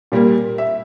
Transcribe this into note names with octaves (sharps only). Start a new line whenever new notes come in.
A#2 G3 A#3
E5